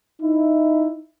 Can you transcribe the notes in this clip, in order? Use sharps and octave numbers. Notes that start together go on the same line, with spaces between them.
D#4 E4